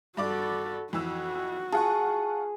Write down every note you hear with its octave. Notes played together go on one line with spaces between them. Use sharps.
G2 F#4 A4 D5 D6
F2 E3 F#4 E6
F4 G#4 F#5 A5 C#6